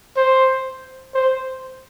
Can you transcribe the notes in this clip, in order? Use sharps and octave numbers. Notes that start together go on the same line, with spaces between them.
C5
C5